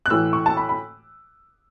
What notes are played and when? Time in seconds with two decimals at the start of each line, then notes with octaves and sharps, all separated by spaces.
0.06 F#6
0.10 A2 E3 E6
0.33 C#6
0.46 A5
0.57 B5
0.69 B5